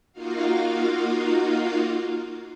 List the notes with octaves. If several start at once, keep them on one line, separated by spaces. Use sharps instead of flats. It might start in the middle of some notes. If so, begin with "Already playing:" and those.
A#3 D#4 F4 F#4 F5